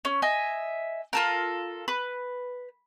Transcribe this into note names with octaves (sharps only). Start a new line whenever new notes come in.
C#4
D#5 E5 G#5
F4 A4 A#4
B4